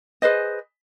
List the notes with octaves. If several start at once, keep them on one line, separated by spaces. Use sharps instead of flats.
G#4 B4 C5 D#5